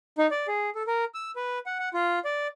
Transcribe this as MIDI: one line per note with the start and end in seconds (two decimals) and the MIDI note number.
0.18 0.27 63
0.31 0.47 74
0.48 0.70 68
0.75 0.83 69
0.87 1.05 70
1.14 1.31 88
1.36 1.59 71
1.66 1.79 78
1.79 1.89 78
1.94 2.19 65
2.25 2.47 74